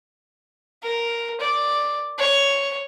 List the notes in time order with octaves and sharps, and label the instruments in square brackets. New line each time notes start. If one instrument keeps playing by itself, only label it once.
[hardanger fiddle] A#4
D5
C#5